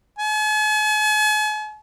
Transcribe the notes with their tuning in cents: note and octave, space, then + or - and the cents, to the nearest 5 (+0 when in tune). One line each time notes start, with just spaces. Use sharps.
G#5 +45